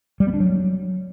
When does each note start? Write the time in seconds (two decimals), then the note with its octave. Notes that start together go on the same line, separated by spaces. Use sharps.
0.20 G3
0.27 B3
0.34 D4
0.40 F#3